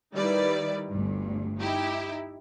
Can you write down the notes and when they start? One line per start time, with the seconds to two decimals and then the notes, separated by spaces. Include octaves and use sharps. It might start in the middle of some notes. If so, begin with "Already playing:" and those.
0.15 D#3 G3 D#4 E4 B4 D5
0.91 G1 D2 G2
1.59 D#4 E4 G4